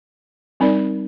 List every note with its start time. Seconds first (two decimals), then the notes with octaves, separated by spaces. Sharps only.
0.60 G3 C4 D#4 A#4 D5